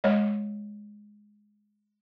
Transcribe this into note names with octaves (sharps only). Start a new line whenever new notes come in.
G#3 C#5 D#5